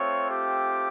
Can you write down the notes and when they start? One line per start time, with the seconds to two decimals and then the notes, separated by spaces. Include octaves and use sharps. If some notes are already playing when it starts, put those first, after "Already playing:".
Already playing: A3 C4 F4 C#5
0.30 G4